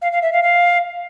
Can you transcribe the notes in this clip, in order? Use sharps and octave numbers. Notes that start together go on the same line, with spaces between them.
F5
F5
E5
F5
F5